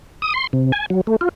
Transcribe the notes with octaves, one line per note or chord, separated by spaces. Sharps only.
D#6
C6
C3
G#5
F#3
A3
F4